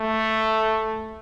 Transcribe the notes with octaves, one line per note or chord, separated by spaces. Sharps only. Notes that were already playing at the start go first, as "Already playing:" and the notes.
Already playing: A3